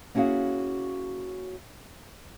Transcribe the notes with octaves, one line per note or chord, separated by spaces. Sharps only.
A#3 C#4 E4 F#4 G#4 F5